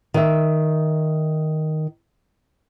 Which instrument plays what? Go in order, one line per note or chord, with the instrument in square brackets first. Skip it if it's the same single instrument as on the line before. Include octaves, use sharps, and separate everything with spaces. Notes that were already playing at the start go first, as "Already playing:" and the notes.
[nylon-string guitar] D#3 E5